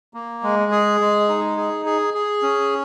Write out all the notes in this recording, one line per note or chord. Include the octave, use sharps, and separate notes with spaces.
A#3
G#3
G#4
G#3
D#4
G#4
G#4
G#4
C#4